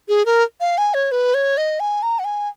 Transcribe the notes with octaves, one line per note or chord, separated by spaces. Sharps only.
G#4
A#4
F5
G#5
C#5
B4
C#5
D#5
G#5
A#5
F#5
G#5